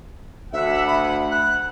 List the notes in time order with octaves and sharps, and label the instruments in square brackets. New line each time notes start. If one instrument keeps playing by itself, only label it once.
[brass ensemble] D2 F#5 [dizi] E5
[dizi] B5
F#6